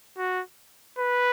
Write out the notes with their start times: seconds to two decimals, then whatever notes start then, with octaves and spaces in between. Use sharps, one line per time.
0.17 F#4
0.98 B4